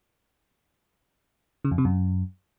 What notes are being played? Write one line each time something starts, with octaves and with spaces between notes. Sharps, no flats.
C#3
F2
C3
F#2